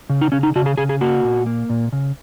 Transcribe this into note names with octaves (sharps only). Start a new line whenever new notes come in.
C#3
D#4
C#3 C#4
D#4
C#3 F#4
G#4
C#3 G#4
G#4
A#3 F#4
A#2
A#3
A#2
C#3